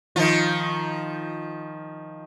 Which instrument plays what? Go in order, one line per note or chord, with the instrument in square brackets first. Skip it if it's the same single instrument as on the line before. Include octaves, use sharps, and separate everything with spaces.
[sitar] D#3 F3 F4